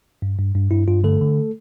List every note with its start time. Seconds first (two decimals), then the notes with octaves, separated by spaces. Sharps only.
0.22 G2
0.39 G2
0.55 G2
0.71 G2 E4
0.88 G2 F4
1.04 D3 A3 A4
1.21 D3